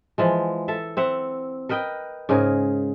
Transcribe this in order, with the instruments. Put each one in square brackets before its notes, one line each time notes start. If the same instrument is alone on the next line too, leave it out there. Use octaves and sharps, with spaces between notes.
[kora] E3 F3 G#3
A4 E5
C4 E5 F#5
A#4 B4 D#5 G5
G#2 C#3 G#4 A#4